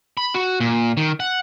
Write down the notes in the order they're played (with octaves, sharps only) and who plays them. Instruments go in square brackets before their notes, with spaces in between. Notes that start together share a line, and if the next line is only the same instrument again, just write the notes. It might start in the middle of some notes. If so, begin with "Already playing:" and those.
[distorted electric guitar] B5
F#4
A#2
D#3
F#5